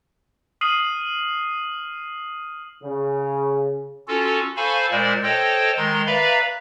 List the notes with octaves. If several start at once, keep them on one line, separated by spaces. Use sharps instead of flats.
D#6 F6 C7 D#7 F#7
C#3
C#4 F4 F#4 A4
A4 C5 F5 G#5 B5 C#6
A#2 G#3 A#4 C5 D5
A4 C5 C#5 D#5 G5
D#3 G#3 A#5 C6
B4 D5 E5 F5 A#5 B5